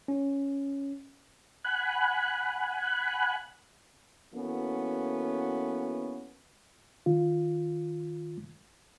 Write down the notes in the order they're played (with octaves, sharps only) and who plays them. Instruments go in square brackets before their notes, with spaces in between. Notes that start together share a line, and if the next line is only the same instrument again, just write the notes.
[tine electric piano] C#4
[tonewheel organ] F#5 G#5 B5 F#6
[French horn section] E3 A#3 B3 C#4 F#4 A4
[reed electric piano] D#3 F4